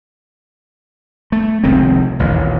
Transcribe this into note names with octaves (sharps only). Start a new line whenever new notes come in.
A3
F1 C#2 D#3 C4
A1 D#2 A#2